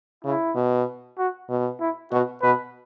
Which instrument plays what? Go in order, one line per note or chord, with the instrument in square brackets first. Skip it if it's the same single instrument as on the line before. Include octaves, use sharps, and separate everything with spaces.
[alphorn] C#3 [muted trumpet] E4
[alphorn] B2
[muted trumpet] F#4
[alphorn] B2
[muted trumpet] E4
[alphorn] B2 [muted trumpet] F#4
[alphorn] B2 [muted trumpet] B4